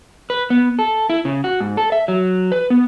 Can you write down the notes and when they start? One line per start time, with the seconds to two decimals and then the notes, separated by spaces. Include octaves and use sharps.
0.30 B4
0.50 B3
0.79 A4
1.10 E4
1.25 C#3
1.44 F#4
1.60 G#2
1.77 A4
1.92 E5
2.08 F#3
2.52 B4
2.70 B3